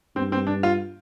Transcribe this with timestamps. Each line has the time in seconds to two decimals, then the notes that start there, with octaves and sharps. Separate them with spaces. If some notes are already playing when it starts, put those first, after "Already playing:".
0.16 G2 C4
0.32 C4
0.47 D4
0.63 F4